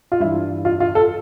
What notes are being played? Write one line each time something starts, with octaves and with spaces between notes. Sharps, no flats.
F4
G2 E3 E4
F4
F4
A4